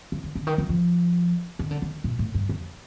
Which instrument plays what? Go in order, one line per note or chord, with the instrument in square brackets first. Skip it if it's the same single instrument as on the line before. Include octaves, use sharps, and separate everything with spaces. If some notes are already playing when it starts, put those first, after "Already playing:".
[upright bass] F3
D#3
D3
D#3
F3
F3
D#3
D3
D#3
A#2
A2
G2
F2